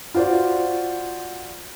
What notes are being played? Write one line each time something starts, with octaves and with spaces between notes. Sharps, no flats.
F4 F#4 C5 D5